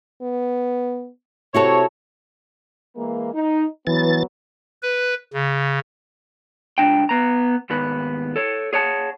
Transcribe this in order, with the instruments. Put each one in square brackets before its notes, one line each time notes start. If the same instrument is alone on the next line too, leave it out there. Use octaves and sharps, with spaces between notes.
[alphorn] B3
[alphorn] C3 [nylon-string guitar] E4 F#4 A4 [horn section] C#5
[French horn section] E3 G#3 A#3
D#4
[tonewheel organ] E3 A6 [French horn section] F#3 B3
[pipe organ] B4
C#3
[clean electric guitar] C#2 C3 D4 G5
B3 A#5
D#2 G#2 B3 B4
A4 C#5
G#4 C#5 F#5 A5